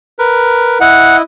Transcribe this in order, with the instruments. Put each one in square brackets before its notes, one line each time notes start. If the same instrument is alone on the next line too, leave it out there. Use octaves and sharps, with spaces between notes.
[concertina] A#4 B4
[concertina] E4 D#5 [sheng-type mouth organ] F#5